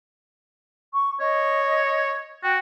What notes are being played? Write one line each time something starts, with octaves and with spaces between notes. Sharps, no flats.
C#6
C#5 D#5
F#4 G5